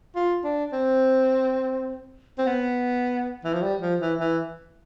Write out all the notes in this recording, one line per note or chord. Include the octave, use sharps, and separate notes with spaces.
F4
D4
C4
C4
B3
E3
F3
G3
F3
E3
E3